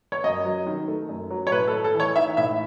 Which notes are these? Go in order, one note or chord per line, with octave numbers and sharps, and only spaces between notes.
C#5
F#2 D#5
F#3
D#3
A3
F#2
F#3
C#5
A2 B4
A4
A3
A4
E3
C#5
D#4 E5
A2 E5